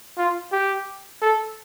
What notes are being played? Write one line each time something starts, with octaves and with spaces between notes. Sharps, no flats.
F4
G4
A4